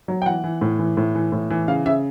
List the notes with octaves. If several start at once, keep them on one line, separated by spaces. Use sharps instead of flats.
F#3
G5
E3 F#5
E3
A2
E3
A2
E3
A2
E3
C#3 F5
C#3 E5